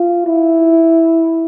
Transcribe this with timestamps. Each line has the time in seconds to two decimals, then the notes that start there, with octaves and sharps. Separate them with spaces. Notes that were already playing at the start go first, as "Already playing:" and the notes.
Already playing: F4
0.26 E4